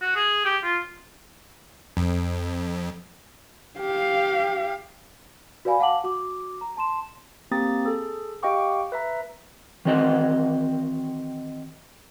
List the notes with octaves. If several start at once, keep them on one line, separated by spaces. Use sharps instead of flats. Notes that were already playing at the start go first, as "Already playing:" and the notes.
F#4
G#4
G4
F4
F2
G4 F5
F#4 B4 D5 F5 G#5 B5
F5 F#5 A5 D6 F#7
F#4 D6
A#5
A5 C6 E7
A#3 C4 G4 A#5 D#6 A6
G#4 A4
G4 D#5 F5 G5 C#6 D6
B4 E5 A#5
D#3 E3 C4 F#4 D#5